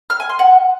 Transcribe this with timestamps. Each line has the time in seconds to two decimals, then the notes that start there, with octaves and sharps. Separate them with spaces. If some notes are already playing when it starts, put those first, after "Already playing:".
0.10 F6
0.20 G#5
0.29 C6
0.39 F#5